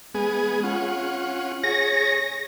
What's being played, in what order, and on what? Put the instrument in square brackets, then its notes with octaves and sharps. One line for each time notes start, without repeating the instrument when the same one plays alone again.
[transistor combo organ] G#3 B3 G#4
C#4 F4 F#5
[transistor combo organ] G#4 C#5 [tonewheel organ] A#6